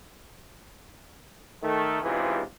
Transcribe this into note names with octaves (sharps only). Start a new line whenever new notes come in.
D#3 A3
C#2 G#2 C3 E3 F4 B4